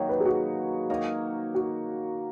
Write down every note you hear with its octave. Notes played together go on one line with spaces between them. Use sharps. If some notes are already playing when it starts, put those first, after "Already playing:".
Already playing: D#3 F#3 A#3 D#4 C#5
B4
G#4
F#4
A#3 D#4 A#4 C#5
F#4